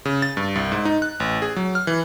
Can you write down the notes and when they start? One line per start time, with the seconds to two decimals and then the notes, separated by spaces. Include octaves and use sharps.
0.05 C#3
0.22 A6
0.37 G2
0.55 C2
0.72 G#2
0.85 D#4
1.02 F#6
1.20 A1
1.42 G#4
1.56 F#3
1.75 F6
1.87 E3